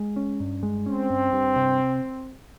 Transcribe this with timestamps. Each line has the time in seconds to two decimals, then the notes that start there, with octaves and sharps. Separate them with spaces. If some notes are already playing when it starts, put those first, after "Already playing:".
Already playing: G#3
0.16 C#4
0.40 G2
0.63 G#3
0.86 C4 C#4
1.10 G2
1.33 G2
1.56 C3